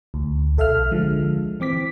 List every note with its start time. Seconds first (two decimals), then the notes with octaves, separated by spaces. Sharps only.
0.14 D2
0.57 B1 A4 E5 F5 F6
0.91 D3 F3 G#3
1.60 E3 C4 D6 B6